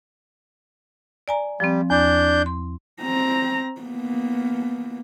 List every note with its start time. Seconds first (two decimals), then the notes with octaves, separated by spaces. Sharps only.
1.28 D5 G#5 A#5
1.60 F3 G3 C4
1.90 E2 D4 G6
2.46 C6
3.01 C4 A#5
3.81 A#3 B3